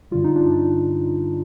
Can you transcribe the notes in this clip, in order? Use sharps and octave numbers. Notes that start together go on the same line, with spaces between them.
G2 D3 G3 F4
D#4
D4 F4